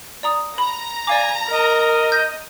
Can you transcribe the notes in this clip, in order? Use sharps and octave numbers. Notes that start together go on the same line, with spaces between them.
D5 A#5 D#6
A#5 B5
D5 F5 G#5 D6
A#4 D#5
G6 A#6